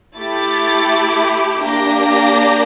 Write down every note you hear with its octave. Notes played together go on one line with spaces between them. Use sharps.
A3 E4 G4 A6
A#3 D4 G4 A#6